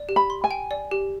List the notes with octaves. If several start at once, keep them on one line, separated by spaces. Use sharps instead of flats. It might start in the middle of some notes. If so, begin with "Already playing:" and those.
Already playing: D5
G4
B5
C6
G#5
G5
D5
G4